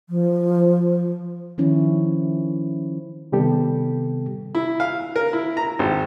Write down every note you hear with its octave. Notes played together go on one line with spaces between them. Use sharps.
F3
D#3 F3 C#4 E4
C3 D#3 G3 B3 G4 A4
E4
F5
A#4
E4
A#5
G#1